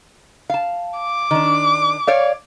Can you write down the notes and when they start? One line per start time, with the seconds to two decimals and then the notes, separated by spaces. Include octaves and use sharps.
0.50 F5 A5
0.98 D6
1.31 D#3 D4
2.07 C#5 D5 F5